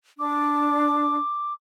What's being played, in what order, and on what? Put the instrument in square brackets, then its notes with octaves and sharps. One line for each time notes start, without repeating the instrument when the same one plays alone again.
[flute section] D4 [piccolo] D6